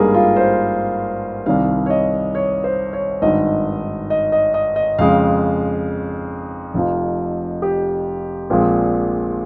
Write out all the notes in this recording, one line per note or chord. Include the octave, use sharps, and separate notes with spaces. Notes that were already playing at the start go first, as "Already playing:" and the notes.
Already playing: G#1 G2 G3 A#3 G#4 A#4
F4
C5
C2 C3 D#3 G3 F5
C#5
D#5
C#5
C5
C#5
G#1 G2 D#3 D#5
D#5
D#5
D#5
D#5
F2 C#3 G#3 F5
F1 F2 C3 F3
G4
A#1 A#2 F3 G#3 C4